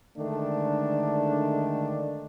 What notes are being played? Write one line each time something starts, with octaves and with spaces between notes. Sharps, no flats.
D3 D#3 G#3 A3 D4